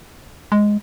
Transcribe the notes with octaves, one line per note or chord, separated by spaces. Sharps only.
G#3